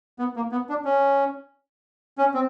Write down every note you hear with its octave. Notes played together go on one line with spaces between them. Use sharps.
B3
A#3
B3
D4
C#4
C#4
C4